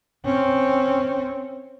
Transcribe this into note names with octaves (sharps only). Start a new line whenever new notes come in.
C4 C#4